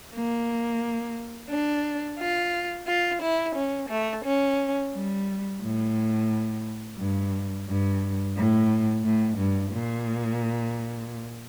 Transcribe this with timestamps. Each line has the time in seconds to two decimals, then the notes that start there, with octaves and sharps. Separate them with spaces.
0.15 A#3
1.52 D4
2.20 F4
2.88 F4
3.23 E4
3.57 C#4
3.91 A3
4.25 C#4
4.94 G3
5.62 A2
6.99 G2
7.68 G2
8.36 A2
9.04 A2
9.38 G2
9.73 A#2